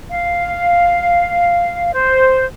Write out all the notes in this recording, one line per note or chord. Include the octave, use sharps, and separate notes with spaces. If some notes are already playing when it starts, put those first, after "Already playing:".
F5
C5